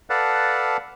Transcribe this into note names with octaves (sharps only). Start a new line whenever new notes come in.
A4 B4 D5 F5 F#5 A5